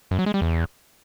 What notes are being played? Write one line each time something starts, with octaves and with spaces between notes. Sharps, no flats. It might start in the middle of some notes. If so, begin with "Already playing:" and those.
F#2
F#3
G#3
G3
E2